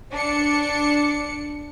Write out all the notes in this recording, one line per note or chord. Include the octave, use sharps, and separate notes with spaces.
D4 D5 C#7